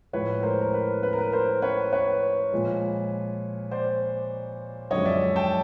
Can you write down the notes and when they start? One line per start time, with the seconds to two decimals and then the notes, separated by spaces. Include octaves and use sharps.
0.13 A2 F3 G#3 B4 C#5
0.43 A#4 C5
0.61 A#4
0.74 B4
1.03 B4
1.13 A#4
1.18 B4
1.32 A#4 C5
1.62 B4 C#5
1.93 B4 C#5
2.52 A#2 F3 G#3
3.71 C5 D5
4.91 F#2 D3 F3 G#3 C#5 D#5
5.06 D5 E5
5.36 G5 A5